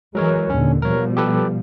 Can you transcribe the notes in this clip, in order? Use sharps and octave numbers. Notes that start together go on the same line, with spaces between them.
E3 F#3 G#3 A#4 C#5
D#2 A#2 D3 C#4
B2 F3 G3 A#4 C#5
G4 A4 B4